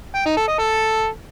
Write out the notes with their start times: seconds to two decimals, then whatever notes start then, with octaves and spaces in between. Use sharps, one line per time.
0.15 G5
0.26 D#4
0.37 A4
0.48 D#5
0.59 A4